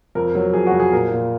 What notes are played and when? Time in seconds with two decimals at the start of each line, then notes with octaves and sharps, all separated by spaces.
0.15 F2 A#4
0.35 F#3
0.53 F2 G#4
0.67 F#4
0.72 F2
0.80 G#4
0.92 A#2 A#4
1.11 A#2